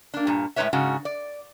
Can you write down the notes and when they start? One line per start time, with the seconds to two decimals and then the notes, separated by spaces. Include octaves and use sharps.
0.14 A#3 D4
0.27 G2 A#2
0.56 A2 G#3 D#4 B4 C#5 E5
0.73 G#2 C#3 D4 F#4
1.05 D5